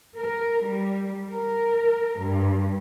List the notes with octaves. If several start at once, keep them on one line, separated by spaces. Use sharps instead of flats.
A#4
G3
A#4
G2